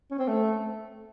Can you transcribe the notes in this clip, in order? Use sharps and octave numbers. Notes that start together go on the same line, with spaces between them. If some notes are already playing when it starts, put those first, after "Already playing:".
C#4
C4
A3